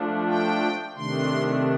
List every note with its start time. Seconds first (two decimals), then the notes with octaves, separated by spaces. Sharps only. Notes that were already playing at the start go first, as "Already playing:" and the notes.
Already playing: F3 A3 D4
0.27 G5
0.95 C3 D#3 A3 D4 C6